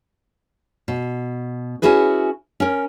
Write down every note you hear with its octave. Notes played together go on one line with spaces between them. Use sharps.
B2
C#4 D4 E4 F#4 G#4 B4
C#4 A#4